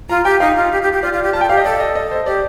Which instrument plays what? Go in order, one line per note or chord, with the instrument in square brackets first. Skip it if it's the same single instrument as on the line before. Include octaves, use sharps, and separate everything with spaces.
[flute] F4 [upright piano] A#5
[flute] G4 [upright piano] G5
[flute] D#4 [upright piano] F5
[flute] F4
G4
G4
G4
[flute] F4 [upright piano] D5
[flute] F4
G4
[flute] F4 [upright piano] A5
[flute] A4 [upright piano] G5
[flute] G4 [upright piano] F5
[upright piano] D#5
[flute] A4 [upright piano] D5
[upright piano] D#5
D#5
C5
[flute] G4 [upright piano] D5